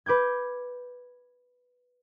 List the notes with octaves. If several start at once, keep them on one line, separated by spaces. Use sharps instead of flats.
B4 D6 G6 G#6